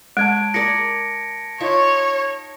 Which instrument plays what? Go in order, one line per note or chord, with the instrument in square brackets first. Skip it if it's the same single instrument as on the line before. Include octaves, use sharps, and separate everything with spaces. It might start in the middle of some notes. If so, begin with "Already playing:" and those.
[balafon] G#3 [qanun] C#5 [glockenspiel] A5 G#6 D7
[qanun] G#4 A#4 D5 [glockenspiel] A#6 C#7
[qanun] D#4 F4 E5 [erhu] C#5